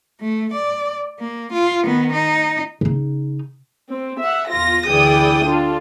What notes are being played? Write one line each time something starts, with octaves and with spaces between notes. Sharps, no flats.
A3
D5
A#3
F4
D#3 B3
D#4
C#3 D#4
C4
E5 F#5
E2 F4 A#6
D2 E3 G#4 D5 G5 D#6
D4 F4 A4